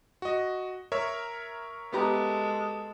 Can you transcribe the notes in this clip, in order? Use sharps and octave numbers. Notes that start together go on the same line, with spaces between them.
F#4 D#5
A#4 C#5 E5
G#3 B3 G4 A4 A#5